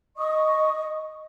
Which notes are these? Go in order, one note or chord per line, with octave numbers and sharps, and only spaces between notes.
D#5 C#6 D#6